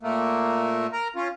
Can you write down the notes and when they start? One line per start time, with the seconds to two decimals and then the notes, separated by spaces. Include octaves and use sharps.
0.03 A#2 A3 A#3
0.93 A#4 A#5
1.16 C#4 F4